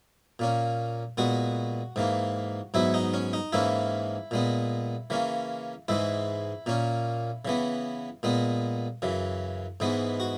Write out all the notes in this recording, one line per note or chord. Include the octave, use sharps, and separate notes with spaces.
A#2 A#3 C#4
A#2 G#3 B3 F#4
G#2 E3 A#3
G#2 F#3 B3 E4
D#4
C#4
D#4
G#2 E3 A#3 C#4 E4
A#2 G#3 B3
C#3 E3 A#3 C#4
G#2 E3 G#3 E4
A#2 A#3 C#4
C#3 E3 B3
A#2 G#3 B3
F#2 C#3 E3
G#2 E3 G#3 B3
F#4